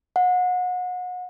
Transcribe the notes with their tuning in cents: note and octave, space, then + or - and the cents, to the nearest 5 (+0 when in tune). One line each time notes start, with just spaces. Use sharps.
F#5 -30